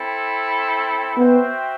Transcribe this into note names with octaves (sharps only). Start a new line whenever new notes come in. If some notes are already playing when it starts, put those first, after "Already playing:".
Already playing: C4 E4 A4
B3 C4 F#4 C5 E5 G5